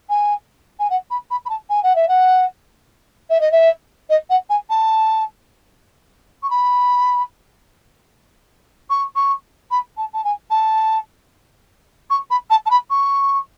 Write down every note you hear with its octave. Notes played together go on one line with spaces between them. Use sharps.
G#5
G#5
F#5
B5
B5
B5
A5
G#5
F#5
E5
F#5
E5
D#5
E5
D#5
F#5
G#5
A5
C#6
B5
C#6
C#6
B5
A5
A5
G#5
A5
C#6
B5
A5
A5
B5
C#6